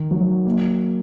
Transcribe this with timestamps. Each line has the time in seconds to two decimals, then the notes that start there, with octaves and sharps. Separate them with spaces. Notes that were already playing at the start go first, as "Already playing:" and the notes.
Already playing: D#3
0.11 F#3
0.45 A#3